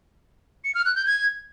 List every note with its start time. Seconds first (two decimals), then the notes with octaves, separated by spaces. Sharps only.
0.64 C#7
0.75 F6
0.85 F#6
0.96 G6
1.06 G#6